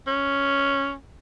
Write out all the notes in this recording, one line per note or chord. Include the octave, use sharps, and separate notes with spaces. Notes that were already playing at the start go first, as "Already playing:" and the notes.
C#4